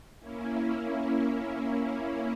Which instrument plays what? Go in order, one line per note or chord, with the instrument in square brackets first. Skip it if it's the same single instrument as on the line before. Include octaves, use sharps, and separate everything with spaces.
[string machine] A#3 C#4 E4